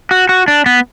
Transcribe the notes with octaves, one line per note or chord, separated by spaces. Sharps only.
F#4
F#4
D4
B3